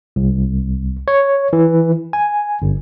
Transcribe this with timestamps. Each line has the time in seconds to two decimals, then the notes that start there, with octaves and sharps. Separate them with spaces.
0.16 C2
1.08 C#5
1.53 E3
2.13 G#5
2.62 G1